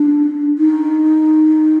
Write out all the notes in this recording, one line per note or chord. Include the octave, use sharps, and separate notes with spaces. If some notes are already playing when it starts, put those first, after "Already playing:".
Already playing: D4
D#4